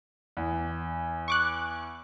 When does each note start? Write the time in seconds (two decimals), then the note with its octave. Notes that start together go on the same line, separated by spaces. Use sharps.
0.37 E2
1.28 C#6 D6 F#6